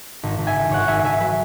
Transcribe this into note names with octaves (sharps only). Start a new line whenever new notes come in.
G#1
G#1
E5 G#5
G#1
G#1 C#5 F#5
G#1 E5 G#5
G#1 E5 G#5
F#3 B4 E5